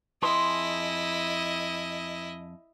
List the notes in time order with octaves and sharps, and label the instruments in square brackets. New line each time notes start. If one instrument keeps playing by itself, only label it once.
[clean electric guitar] F2 G#4 C6 [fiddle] E4 D#5